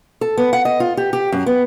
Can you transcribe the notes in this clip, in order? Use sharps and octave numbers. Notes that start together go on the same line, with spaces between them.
A4
B3
F#5
D#5
F4
G4
G4
F#2
B3